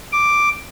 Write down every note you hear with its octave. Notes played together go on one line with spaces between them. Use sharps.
D6